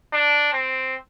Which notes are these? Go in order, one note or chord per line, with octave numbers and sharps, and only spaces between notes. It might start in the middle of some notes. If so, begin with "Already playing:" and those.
D4
C4